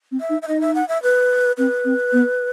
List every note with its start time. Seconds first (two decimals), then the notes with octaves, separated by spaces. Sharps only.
0.12 C4
0.20 E5
0.30 D#4
0.42 E5
0.48 D#4 D#5
0.61 E5
0.75 F#5
0.89 E5
1.03 B4
1.57 C4 B4
1.85 C4
2.13 B3